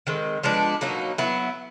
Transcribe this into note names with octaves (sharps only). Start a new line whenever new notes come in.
D#3 G#3 C4
F3 G#3 B3 D4
B2 F#3 A#3 D#4
F#3 B3 E4